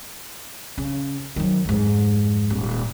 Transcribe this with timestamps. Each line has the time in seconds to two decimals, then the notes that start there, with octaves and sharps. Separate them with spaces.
0.78 C#3
1.36 D#3 F#3
1.65 F2 G#2
2.50 D#1